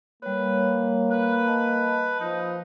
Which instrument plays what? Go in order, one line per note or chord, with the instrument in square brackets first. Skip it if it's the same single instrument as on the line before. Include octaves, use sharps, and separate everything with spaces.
[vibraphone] G3 C#5 [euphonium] A#3 [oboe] B4
[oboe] B4
[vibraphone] D#5 A5
[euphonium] F3 [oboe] D#4